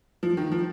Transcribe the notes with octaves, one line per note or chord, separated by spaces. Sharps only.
F3
D#3
F3